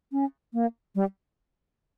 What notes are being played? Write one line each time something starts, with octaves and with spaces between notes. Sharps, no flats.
C#4
A#3
G3